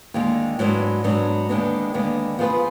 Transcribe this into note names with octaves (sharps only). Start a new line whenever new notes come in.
D#2 D3 G#3
G#2 F#3 B3 D4
G#2 F#3 B3 D4
D#2 D3 G#3 B3 D4
D#2 D3 G#3 B3 D4
F3 B3 F4 G#4 B4